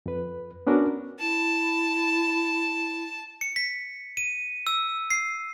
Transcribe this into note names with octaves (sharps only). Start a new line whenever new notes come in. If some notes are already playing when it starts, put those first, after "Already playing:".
F2 B4
B3 C#4 D4 F#4 A#4
E4 A5
C#7
B6
D#7
E6
C7